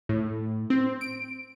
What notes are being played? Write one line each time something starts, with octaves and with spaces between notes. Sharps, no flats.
A2
C4
D7